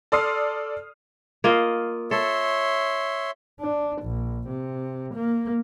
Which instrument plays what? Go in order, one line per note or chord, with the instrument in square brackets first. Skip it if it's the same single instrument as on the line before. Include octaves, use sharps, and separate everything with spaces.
[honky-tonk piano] A4 D5 C6 D#6 F6 C7
[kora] A#3 F4 D#5
[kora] A4 [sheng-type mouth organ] C#5 E5 C6
[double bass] D4
A#1
C3
A#3